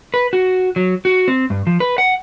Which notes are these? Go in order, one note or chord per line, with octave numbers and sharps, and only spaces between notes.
B4
F#4
F#3
F#4
C4
G2
F3
B4
F#5